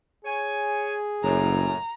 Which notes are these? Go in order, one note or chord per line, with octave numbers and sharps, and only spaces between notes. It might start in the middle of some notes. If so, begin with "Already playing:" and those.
G#4 C#5 G#5
F#1 F#2 A2 A#5